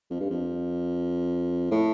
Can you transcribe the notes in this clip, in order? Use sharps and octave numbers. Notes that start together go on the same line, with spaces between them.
F2
G2
F2
A2